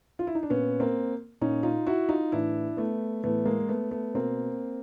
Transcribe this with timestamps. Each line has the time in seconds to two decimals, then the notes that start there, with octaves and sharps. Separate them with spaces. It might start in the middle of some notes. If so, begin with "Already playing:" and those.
0.19 F4
0.27 E4
0.35 D#4
0.43 D4
0.50 A#2 B3 C#4
0.80 A#3 C4
1.41 A#2 C#4 D#4
1.63 D#4 F4
1.87 E4 F#4
2.09 D#4 F4
2.32 A2 E3 D4 E4
2.77 A3 B3
3.24 A2 E3 A3 B3
3.45 G#3 A#3
3.68 A3 B3
3.91 A3 B3
4.14 B2 A#3 C4